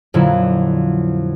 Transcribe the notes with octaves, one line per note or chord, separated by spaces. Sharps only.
F2 A#2 D3 F#3 E4